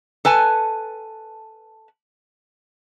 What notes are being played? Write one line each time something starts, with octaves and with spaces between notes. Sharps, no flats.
A4 B4 G#5 A5